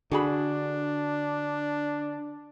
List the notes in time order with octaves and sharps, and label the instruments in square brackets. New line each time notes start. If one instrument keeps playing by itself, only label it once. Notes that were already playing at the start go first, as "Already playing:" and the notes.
[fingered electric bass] D3 [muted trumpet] D4 [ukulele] F#4 G#4 B5